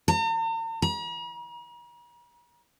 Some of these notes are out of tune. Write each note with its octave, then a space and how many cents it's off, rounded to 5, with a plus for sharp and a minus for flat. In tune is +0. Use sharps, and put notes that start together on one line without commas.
A#5 -45
A#5 +45